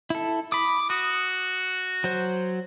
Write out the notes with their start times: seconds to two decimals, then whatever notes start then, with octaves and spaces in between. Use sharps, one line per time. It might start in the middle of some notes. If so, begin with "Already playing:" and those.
0.10 E4 A4
0.52 B5 D6 D#6
0.90 F#4 D#6
2.04 F#3 C5